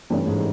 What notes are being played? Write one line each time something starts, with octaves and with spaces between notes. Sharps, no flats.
G2 E3 G3 A3 C#4
G#2 G#3